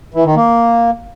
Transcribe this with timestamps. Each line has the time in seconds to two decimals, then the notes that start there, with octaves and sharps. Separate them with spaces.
0.14 E3
0.25 D#3
0.36 A#3